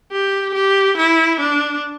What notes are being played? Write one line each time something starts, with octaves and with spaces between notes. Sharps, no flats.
G4
G4
E4
D4